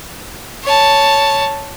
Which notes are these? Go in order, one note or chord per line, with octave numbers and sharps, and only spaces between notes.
C#5 A5